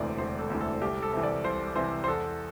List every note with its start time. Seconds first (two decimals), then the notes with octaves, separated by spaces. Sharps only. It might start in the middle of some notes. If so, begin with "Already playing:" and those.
Already playing: E1 D2 C3 E3 C5 D5
0.18 E1 C5
0.39 A4
0.50 D2 C3 E3
0.61 A4
0.81 C2 G4
1.03 A4
1.13 C3 E3
1.23 D5
1.44 C2 C5
1.76 C3 E3 C5
2.04 C5
2.08 E2 A4